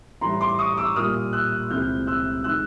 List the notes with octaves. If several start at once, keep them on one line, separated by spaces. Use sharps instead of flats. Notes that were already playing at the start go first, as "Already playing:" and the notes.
A2 E3 G3 A#5 C6
C6 D6
C#6 D#6
D6 E6
A#2 G3 A#3 D#6 F6
E6 F#6
C#2 C3 E3 A3 F6 G6
E6 F#6
D#3 G#3 E6 F#6